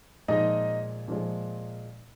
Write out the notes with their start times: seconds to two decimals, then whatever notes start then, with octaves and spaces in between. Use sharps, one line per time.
0.28 A#2 F3 G#3 D#4 D#5
1.08 A#2 F3 G#3